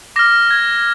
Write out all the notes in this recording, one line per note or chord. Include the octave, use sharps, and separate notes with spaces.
D6 F6 A#6
G#6